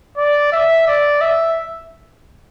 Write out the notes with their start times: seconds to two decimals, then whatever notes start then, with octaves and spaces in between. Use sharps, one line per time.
0.17 D5
0.52 E5
0.87 D5
1.21 E5